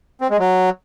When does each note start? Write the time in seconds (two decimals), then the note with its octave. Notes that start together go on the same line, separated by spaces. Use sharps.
0.21 C4
0.30 G#3
0.40 F#3